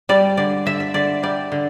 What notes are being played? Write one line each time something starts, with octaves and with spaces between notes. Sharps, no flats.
G3 D5
D3 D5
D3 E5
E5
D3 D5
G3 D5
D3